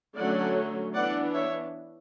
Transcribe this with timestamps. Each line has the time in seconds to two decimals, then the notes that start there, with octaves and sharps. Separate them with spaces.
0.17 D3 F#3 A3 C#4 D5 F#5
0.95 E3 B3 D4 D5 F#5
1.34 C#5 E5